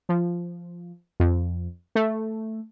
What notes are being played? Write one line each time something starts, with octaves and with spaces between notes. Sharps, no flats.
F3
F2
A3